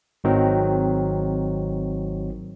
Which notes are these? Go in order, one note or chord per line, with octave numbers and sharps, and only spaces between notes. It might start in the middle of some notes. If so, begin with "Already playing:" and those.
G#1 D#3 F#3 C4